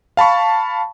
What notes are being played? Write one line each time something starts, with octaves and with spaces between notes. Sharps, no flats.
F5 A5 B5 C#6